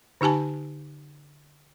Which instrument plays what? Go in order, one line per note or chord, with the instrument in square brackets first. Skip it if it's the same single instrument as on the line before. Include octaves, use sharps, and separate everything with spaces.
[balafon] D3 D#4 G4 G#5 A5